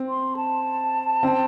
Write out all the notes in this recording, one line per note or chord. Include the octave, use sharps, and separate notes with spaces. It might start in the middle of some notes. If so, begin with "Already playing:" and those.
Already playing: C4
C6
A5
C4